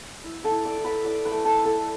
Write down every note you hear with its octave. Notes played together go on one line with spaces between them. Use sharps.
E4
A4 A5
E4
D5 D6
E4
B4 B5
E4 D5 D6
B4 B5
A3
A4 A5
E4
A4 A5